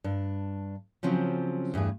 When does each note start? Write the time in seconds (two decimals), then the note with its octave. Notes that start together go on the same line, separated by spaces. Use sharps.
0.04 G2 D4
1.03 C#3 F3 F#3 C4 C#4
1.74 E2 G2 A3 G#4